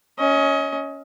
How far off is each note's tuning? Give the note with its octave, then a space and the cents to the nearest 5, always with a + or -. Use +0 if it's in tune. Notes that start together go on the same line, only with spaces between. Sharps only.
C#4 +10 D#5 +30